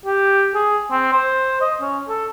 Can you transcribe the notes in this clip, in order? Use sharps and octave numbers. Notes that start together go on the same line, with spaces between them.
G4
G#4
C4
C5
D#5
C#4
A4